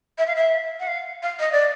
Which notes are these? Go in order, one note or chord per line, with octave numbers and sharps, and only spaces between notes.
E5
F5
E5
F#5
F5
F5
D#5
D5